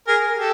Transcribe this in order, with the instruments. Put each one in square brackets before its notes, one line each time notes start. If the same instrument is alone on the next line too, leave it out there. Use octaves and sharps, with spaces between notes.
[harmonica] G#4 A#4
G4 A4